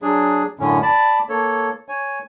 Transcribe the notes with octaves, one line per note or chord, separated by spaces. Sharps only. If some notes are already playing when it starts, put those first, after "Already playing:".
F#3 D4 G#4
F#2 A2 D3 C#4
D5 A5 B5
A#3 A4 C#5
C#5 G#5